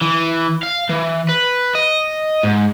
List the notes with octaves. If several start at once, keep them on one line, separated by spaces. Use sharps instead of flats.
E3
F5
E3
B4
D#5
G#2